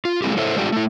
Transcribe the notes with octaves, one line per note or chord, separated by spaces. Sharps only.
F4
G#3 A3 C4 E4 G4
E4 A4 C5 C#5 E5
G#3 A3 D4 F4 G4
A3 E4